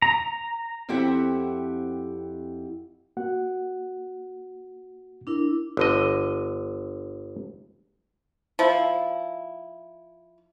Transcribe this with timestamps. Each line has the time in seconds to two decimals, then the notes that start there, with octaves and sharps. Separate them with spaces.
0.02 A#5
0.89 F2 C4 E4 G4 E5 F#5
3.17 A#3 F#4 F#5
5.27 D4 E4 A#4
5.77 G1 D3 D#5
8.59 F3 E4